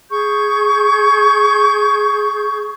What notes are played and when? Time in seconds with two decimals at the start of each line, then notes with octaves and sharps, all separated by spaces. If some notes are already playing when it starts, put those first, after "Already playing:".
0.10 G#4 C#6 G6